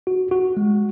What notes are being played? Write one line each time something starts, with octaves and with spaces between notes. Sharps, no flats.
F#4
F#4
G#3